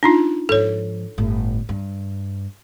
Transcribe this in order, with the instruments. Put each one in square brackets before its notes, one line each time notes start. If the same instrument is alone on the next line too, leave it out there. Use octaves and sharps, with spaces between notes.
[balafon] D4 D#4 F4
[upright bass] G#2 F3 [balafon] A4 C#5
[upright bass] G1 A2
G2